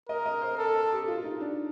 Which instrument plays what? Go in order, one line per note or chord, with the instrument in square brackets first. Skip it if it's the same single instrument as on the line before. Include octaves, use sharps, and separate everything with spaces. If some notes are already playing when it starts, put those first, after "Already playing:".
[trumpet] A#4 [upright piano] D#5
[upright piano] D#5
C5
[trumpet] A4 [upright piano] A#4
[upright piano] A#4
G4
F4
F4
D#4
D4